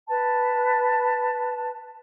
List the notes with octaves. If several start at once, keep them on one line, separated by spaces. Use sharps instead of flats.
B4 A5